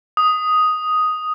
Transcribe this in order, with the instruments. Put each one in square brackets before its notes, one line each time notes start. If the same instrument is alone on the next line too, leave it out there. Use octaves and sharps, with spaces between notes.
[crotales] D#6